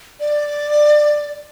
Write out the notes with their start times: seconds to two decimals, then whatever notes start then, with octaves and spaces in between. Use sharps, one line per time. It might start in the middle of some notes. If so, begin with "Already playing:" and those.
0.20 D5